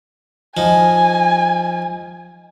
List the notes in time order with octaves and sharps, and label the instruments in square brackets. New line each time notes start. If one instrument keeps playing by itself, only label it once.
[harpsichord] F3 D#4 [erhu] G#5